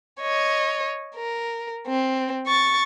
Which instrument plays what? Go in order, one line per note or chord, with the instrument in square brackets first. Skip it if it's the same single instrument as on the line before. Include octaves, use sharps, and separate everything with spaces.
[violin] C#5 D#5
A#4
C4
C#6 A6